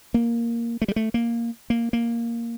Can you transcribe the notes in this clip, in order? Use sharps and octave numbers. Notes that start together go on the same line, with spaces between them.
A#3
A3
G3
A3
A#3
A#3
A#3